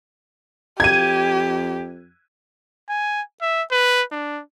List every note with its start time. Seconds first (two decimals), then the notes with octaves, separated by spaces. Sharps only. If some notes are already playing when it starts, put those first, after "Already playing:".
0.80 F2 G4 G#6 D#7
2.89 G#5
3.42 E5
3.71 B4
4.12 D4